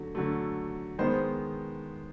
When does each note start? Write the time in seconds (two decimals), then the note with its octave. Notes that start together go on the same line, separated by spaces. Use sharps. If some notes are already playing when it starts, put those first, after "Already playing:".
Already playing: D3 F#3 A3
0.15 D3 F#3 A3
0.99 D#3 G#3 B3 C5